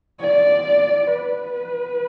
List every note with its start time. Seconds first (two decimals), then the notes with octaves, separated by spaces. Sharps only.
0.20 D5
1.07 B4